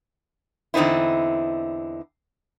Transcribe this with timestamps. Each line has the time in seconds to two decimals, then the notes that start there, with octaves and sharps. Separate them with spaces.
0.74 E2 D3 C4 D#4 E4